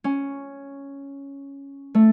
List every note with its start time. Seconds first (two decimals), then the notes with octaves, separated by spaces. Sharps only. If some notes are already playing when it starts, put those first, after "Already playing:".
0.04 C#4
1.95 A3